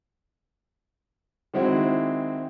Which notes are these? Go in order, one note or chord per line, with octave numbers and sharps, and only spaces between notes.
D#3 G#3 C4 E4 F#4 C5